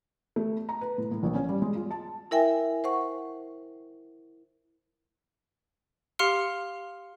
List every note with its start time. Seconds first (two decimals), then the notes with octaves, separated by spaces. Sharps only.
0.36 A3
0.69 A#5
0.81 B4
0.98 A2
1.12 A2
1.23 A#1
1.35 C#4
1.49 G3
1.62 G#3
1.75 F4
1.91 A5
2.31 E4 A#4 E5 G5 G#5
2.84 C5 F#5 C#6
6.19 G4 F5 C6 F6 C#7